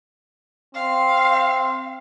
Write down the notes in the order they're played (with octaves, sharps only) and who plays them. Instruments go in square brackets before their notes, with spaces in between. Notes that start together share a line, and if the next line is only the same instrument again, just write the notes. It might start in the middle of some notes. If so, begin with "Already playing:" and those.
[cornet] C4 [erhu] F5